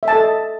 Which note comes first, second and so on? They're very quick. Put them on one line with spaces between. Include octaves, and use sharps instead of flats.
E5 A5 A4 D#5